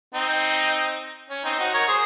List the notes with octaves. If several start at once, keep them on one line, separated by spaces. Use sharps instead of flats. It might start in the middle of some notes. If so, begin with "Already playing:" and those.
C4 D#4
C#4
C4 D#4
D#4 F#4
A#4 C#5
G#4 C5